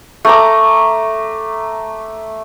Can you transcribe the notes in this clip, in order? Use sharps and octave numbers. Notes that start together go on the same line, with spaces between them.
A3 A#5 D6